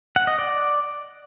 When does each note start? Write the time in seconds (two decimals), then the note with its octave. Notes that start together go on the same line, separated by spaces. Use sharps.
0.16 F#5
0.27 D#5
0.39 D5